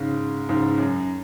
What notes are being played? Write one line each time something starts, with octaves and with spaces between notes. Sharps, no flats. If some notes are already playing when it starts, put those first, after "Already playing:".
Already playing: G#2 C#3
G#2 C#3
F#2